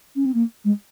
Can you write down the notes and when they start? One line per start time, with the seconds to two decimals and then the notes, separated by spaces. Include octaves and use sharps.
0.16 C#4
0.26 C4
0.34 A#3
0.65 G#3